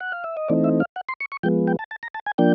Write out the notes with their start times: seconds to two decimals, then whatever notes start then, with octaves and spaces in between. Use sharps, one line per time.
0.01 F#5
0.12 F5
0.24 E5
0.37 D#5
0.48 E3 A3 C4 D#4 D5
0.64 E5
0.80 F5
0.96 F#5
1.09 C6
1.20 C#6
1.32 C#6
1.43 F3 G#3 B3 G5
1.67 G5
1.79 A5
1.91 A5
2.03 A#5
2.14 A5
2.26 G#5
2.38 F3 A#3 D4 G5